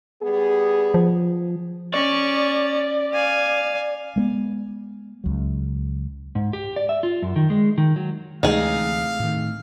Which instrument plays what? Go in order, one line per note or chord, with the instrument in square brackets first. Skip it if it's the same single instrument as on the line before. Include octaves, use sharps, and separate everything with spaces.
[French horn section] G3 B3 G#4
[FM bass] F3
[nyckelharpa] C#4 C#6 [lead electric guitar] D5
[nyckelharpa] F5 G#5
[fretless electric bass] G#3 A#3 B3
C#2 F#3
[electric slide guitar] G#2
G4
D5
E5
F4
F#2
D#3
G#3
D#3
F#3
[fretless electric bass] D2 E3 G#3 [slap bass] C3 A3 [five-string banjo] D#4 G#4 [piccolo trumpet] F5
[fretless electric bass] A2 D#3